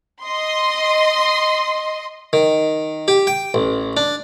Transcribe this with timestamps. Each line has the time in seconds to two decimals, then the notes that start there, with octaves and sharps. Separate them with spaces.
0.23 D#5 C6
2.33 D#3
3.08 G4
3.27 G5
3.54 A1
3.97 D4